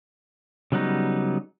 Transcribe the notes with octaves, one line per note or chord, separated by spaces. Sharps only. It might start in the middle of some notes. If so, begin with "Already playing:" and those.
C#3 F#3 G3 B3 D#4